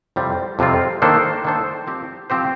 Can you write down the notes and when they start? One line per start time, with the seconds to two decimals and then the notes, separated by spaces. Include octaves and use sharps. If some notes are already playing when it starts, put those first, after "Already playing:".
0.16 F2 C3 G3 C4 F4
0.59 F2 C3 G3 C4 F4
1.02 D#3 A#3 D4 A4 C5
1.44 D#3 A#3 D4 A4 C5
1.87 F3 C4 G4 C5
2.30 F3 C4 G4 C5